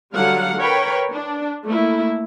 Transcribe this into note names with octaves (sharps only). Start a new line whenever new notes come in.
D3 F#3 G3 F5 F#5
A#4 B4 C#5 G5 B5
D4
A3 A#3 E4